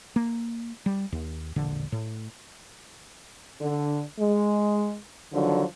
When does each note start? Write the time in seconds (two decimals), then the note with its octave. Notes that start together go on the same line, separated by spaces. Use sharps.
0.16 A#3
0.86 G3
1.12 D#2
1.56 E1 A#1 D3
1.92 A2
3.61 D3
4.19 G#3
5.33 D3 D#3 F3 F#3